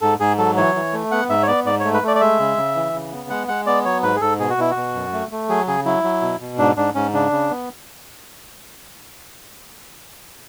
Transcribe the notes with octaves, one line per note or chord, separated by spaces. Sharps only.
G#2 A4
G#2 G#4
F#3 A4
E3 C#5
E3
A3
B3 F#5
G#2 E5
C#5
B3 D5
G#2 D5
C#5
A3
B4
A3 D5
D5
G#3 E5
C#3
C#3
E3
C#3
B3
G#3 F#5
G#3 F#5
B3 D5
F#3 C#5
G#2 B4
G#4
G#2 A4
B2 G#4
F#4
B2 E4
F#4
B2
F#2
A3
A3
F#3 G#4
C#3 G#4
F#3 E4
F#3
B2
B2
G#2 D4
G#2 D4
G#2 C#4
C#3 D4
C#3
B3